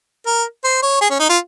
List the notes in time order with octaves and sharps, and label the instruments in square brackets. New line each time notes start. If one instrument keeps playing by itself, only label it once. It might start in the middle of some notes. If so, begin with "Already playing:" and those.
[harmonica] A#4
C5
C#5
G#4
C#4
D#4
F4